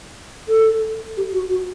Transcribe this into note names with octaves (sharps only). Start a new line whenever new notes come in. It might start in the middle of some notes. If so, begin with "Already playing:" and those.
A4
G4
F#4
F#4